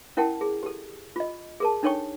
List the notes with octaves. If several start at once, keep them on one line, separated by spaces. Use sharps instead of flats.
C#4 E4 A#4 F#5 G5 A5
G#4
G4 A4
F4 D#5
G#4 A#4 A5
D4 D#4 A4 C#5 G5 C#6